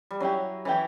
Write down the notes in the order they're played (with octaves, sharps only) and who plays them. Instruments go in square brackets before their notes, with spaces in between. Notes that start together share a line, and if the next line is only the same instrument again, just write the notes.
[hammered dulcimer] G3
[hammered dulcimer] F#3 [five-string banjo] C#4 E4 G4
[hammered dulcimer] E3 [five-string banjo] C#4 E4 G4